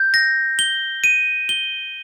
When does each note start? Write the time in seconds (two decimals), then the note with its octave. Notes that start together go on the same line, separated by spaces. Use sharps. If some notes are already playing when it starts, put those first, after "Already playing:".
Already playing: G6
0.14 A#6
0.59 G7
1.04 D#7
1.49 G7